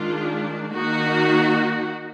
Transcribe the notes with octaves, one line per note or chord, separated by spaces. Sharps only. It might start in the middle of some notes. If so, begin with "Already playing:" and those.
Already playing: D#3 G#3 D4 F4
D#3 A#3 D#4 F#4